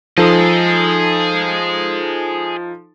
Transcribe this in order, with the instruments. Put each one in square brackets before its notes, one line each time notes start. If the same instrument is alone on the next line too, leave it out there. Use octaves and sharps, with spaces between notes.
[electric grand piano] F3 D#4 A4 [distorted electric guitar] G#4 D#5